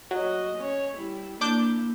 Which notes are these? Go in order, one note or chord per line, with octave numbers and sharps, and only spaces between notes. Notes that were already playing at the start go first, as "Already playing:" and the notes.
F#3 F#4 D#5
C#4 C#5
G3 E4
A#3 D4 E4 D6 G6